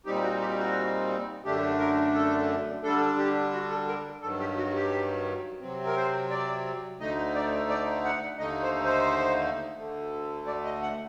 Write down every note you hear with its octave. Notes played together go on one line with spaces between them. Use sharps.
A#2 G3 C4 D#4 G4
F#4
G4
F#4
F#2 D3 A3 D4 G4
A#4
A4
D3 G3 D4 A4
G4
F#4
A4
A#4
G2 D#3 F#3 A4
G4
F#4
G4
C3 F#3 C4
A#4
C5
D5
D2 D3 A3 D#4 D#5
D5
D5
F#5
D#2 D3 A3 D#4 D#5
C5
C5
D2 D3 A3
D5
D#5
F#5